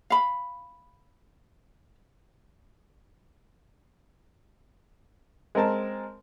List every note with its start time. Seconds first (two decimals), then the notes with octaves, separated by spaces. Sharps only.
0.10 F5 B5
5.55 G#3 C4 A#4 A5